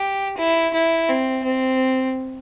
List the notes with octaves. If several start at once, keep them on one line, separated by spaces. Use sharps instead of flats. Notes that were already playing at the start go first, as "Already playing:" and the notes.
Already playing: G4
E4
E4
C4
C4